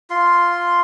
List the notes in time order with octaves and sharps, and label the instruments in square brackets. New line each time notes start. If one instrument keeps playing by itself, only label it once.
[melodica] F4 C6